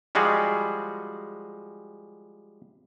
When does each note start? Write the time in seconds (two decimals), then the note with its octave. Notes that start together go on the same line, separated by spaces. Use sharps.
0.15 F3 G3 G#3 F#4 G#4